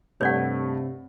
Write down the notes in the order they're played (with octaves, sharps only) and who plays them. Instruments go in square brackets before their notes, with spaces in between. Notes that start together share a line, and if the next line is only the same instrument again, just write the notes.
[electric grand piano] G2 A3 [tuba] C3 [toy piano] C#5 D5 F#5